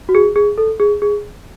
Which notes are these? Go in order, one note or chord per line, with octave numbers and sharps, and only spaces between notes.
F#4
G#4
G#4
A4
G#4
G#4